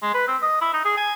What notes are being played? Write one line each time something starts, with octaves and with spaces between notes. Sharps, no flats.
G#3
B4
C4
D#5
E4
D#4
G#4
G#5